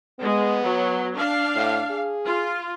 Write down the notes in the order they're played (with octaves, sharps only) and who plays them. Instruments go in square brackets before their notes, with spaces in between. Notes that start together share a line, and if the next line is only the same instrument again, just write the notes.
[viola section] G#3 [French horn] B3
[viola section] F#3
D4 F5
[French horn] A2
G#4
[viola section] F4